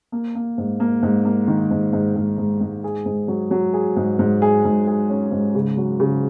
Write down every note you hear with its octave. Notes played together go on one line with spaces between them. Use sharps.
A#3
A#3
G#2
A#3
G#2
A#3
D#3
G#2
G#2
G#2
G#2
G#2
G#4
G#2
F#3
F#3
G#4
G#2
G#2
G#4
G#2
G#4
C#4
G#2
C#3
F#3
C#3